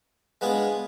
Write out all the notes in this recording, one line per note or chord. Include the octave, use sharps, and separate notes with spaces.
G#3 B3 D4 F4 G#4